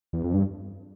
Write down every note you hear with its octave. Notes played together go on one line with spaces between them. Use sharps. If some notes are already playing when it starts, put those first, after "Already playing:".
E2
F2
G2